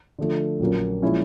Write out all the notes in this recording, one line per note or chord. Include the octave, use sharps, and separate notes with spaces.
D3 F3 A3
A#1 A#2 F#3 A#3 C#4
A#2 F3 G#3 C#4 E4